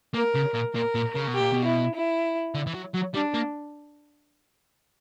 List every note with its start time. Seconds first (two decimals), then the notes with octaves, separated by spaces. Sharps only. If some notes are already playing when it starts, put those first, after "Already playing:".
0.14 A#3 A#4
0.35 C#3
0.54 A#2
0.75 A#2 A#4
0.95 A#2
1.15 C#3
1.27 B2
1.34 G4
1.40 A#2
1.53 B2
1.65 E4
1.95 E4
2.55 D3
2.67 E3
2.74 F#3
2.94 F#3
3.14 G3 D4
3.34 A#3